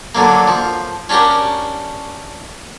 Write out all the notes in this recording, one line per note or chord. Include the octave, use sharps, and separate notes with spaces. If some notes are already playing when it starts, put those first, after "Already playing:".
D3 F#3 A#3
F3
C#4 D4 F#4 G4 A#4